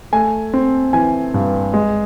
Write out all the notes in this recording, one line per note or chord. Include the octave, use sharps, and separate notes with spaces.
A3 G#5
C4
E3 G#5
G2
G#3